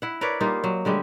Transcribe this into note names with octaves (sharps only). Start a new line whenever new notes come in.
E4 F#5
A#4 B4 C#5 D5
G3 A#3 D#4 F4
F#3
D3 G3 G#3 G4